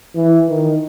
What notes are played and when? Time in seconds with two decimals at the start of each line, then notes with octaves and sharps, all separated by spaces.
0.15 E3
0.49 D#3